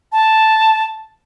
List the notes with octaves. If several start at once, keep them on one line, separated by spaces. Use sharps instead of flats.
A5